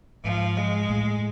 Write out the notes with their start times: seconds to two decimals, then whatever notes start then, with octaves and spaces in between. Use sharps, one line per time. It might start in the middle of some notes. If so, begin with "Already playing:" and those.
0.24 G#2 F3
0.57 G#3
0.90 A2